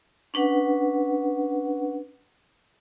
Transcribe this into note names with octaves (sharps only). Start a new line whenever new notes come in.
C#4 D4 B4 F#5